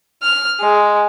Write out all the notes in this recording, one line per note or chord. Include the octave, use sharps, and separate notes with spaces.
F6
G#3